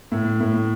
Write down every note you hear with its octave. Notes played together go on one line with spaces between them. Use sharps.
A2
A2